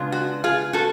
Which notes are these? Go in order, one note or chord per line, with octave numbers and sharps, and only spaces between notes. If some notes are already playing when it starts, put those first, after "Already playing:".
Already playing: C#3 G#3 B3 D4 F4
F#4
F4 G#4
F#4 A4